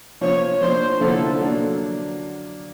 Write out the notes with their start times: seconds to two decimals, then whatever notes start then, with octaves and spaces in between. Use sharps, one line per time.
0.21 F3 A#3 C#4 C#5
0.61 F3 A#3 D4 C5
1.01 D3 F3 A#3 C#4 E4 A4
1.41 F#3 A#3 D4